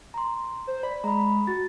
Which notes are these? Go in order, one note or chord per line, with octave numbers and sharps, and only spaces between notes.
A#5 C6
C5
D5 B5
G#3 A#5 B5
F#4 A6